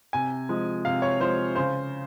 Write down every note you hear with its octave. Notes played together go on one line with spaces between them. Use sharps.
C3 G#5
F3 G#3
C3 F5
C#5
F3 G#3 C5
C#3 C5